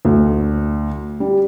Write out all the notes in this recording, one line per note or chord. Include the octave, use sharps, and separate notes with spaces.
D2
G3